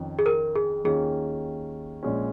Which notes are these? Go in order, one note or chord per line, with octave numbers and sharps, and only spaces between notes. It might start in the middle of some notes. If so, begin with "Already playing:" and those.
Already playing: F2 D#3 C#4
G#4
A#4
G#4
D#2 D#3 C#4 F4 G#4
A#1 A#2 G#3 C#4